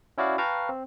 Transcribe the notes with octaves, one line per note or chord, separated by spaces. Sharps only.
C#4 E4 F#4 D5 F5
B4 F5 G5 A5 A#5 C#6
C4